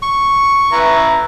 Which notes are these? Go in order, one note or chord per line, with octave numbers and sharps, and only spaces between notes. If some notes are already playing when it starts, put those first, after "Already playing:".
C#6
E4 B4 A#5